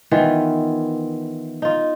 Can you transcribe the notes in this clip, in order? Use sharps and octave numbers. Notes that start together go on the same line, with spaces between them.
D#3 E3 B3 F4
D#4 F4